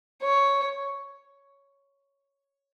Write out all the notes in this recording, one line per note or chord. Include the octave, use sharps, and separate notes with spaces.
C#5